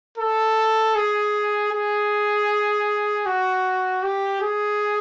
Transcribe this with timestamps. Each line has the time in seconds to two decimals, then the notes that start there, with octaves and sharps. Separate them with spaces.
0.18 A4
0.95 G#4
1.72 G#4
3.26 F#4
4.03 G4
4.41 G#4